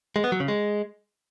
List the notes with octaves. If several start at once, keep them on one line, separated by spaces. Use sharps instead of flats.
G#3
B3
F#3
C#3
G#3